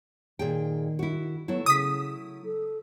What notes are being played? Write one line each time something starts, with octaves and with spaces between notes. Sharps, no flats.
A#2 D#3 G#4 G5
E4 F#4
F#3 A3 B3 E4
C#3 D#6 B6
A4